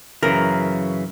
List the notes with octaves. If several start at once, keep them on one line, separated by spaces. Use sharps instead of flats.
F#2 C#3 E3 A#4